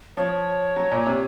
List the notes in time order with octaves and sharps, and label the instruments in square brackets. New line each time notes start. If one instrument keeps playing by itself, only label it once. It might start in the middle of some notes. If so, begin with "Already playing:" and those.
[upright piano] F3 [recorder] C#5
[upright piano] F#3
A#2
C3